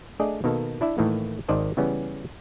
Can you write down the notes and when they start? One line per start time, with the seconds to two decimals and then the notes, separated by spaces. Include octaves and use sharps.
0.20 A3 D4 G#4 D5 D#5
0.44 B2 D#3 A#3 A4
0.81 D4 E4 D5 E5
0.98 A2 D#3 E3 A3 A#3
1.48 G#1 D#3 C5 D5 D#5 A5
1.77 C#3 E3 G3 B3 C#4